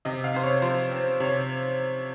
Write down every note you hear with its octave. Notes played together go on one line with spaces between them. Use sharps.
C3 D#5
F5
C3 C5
C#5
F3 C5
C4
C3 C#5